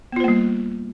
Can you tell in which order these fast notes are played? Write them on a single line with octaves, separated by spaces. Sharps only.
B3 F4 C5 A#3 G3